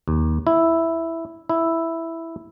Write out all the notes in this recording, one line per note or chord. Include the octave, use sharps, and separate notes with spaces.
D#2
E4
E4